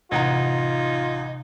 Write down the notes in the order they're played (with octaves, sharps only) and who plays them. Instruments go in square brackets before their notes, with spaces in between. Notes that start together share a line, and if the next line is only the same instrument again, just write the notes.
[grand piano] A1 F#5 A#5 [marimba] C3 [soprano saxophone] D#4 [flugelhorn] F4